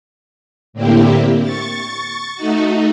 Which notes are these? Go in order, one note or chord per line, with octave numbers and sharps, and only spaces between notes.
A2 D3 A#3 C4 E4 G4
C#6 A6
A3 D#4 F#4